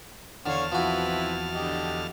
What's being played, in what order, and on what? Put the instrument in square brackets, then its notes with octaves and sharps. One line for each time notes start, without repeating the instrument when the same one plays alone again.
[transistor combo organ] E2 A5 F6 [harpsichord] D3 [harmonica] C#5 F5
[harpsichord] F3 F#4 [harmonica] C4 E4 B4
[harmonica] D3 G4 D#5